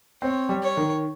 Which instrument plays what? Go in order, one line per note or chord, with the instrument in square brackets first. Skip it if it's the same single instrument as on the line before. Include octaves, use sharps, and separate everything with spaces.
[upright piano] C4 [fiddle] C#5
[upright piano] G3
[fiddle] C#5
[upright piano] D#3